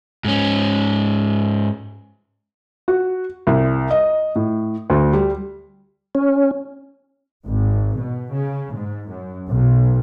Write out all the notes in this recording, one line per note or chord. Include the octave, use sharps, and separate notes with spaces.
G#2 C#4
F#4
C2
D#5
A2
D2
G3
C#4
G#1
B2
C#3
G#2
F#2
B1